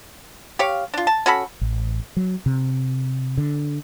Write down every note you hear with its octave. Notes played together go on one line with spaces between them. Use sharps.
G4 C#5 F5
D4 F4
A5
C#4 F#4 A4 B5
A1
F#3
C3
D3